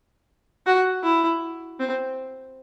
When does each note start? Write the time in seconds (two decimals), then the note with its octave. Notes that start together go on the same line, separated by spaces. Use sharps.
0.66 F#4
1.04 E4
1.79 C4